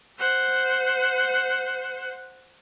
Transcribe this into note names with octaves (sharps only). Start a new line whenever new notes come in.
C5 F#5